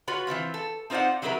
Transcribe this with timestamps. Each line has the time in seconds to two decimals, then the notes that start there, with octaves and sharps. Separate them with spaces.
0.07 F4 F#4 B4 C#5
0.27 E3 F3 C4 F4
0.54 A4
0.90 C4 D#4 F4 C5 D5 F#5
1.22 C3 F#3 B3 E4 A#4 B4